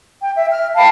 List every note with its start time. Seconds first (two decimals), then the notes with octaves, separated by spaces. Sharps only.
0.20 G5
0.36 E5
0.51 F6
0.75 F5 G5 A5 B5